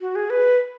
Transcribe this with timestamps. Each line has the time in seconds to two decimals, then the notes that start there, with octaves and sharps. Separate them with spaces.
0.01 F#4
0.15 G#4
0.30 B4